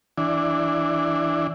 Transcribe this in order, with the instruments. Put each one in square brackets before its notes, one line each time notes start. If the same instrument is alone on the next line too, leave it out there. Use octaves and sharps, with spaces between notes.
[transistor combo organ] E3 D4